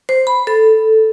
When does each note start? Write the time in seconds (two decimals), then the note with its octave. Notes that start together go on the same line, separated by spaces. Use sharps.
0.09 C5
0.27 B5
0.47 A4